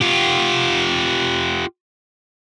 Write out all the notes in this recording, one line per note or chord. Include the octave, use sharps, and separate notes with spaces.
F4 G4